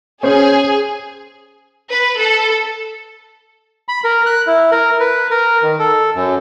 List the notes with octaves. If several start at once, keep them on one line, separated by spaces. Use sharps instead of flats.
C#4 G#4 C5
B4
A4
B5
A#4
F#6
E4
A#4
B4
A#4
D#3
A4
F#2